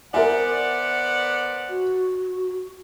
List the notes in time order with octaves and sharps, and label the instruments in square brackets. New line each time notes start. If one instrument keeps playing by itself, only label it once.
[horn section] B3 C5 D5 [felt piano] A#4 E5 G#5 [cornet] F#5
[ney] F#4